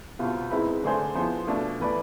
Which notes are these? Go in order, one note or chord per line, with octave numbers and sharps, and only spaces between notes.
C2 B2 B3 F4
G#2 G#3 C4 E4 B4
D3 A3 D4 G#4 C5
F3 B3 E4 G#4 C5
B2 A3 D4 F4
E3 A3 E4 B4 D5